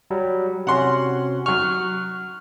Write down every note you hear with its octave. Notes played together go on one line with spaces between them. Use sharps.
F#3 G3
C3 C#4 F#4 F#5 C6
F#3 C#6 F6